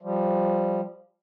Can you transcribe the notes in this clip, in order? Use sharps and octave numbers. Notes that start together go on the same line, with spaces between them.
F3 G3